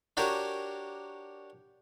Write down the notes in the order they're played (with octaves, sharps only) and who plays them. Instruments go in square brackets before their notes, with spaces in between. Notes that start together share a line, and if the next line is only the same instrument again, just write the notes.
[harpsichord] D4 F#4 G4 A#4 C#5